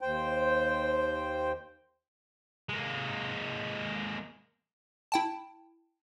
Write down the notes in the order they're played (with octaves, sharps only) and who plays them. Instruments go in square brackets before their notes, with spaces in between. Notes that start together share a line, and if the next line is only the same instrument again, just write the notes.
[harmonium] D#2 C5 G5
[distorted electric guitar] G#3 A#3
[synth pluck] E4 G5 A5